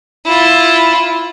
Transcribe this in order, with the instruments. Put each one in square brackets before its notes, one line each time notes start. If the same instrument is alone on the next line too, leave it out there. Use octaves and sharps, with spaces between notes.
[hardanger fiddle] E4 F4